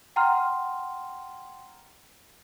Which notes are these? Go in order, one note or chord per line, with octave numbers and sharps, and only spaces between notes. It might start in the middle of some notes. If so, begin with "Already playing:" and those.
F#5 G5 A#5 C6 F6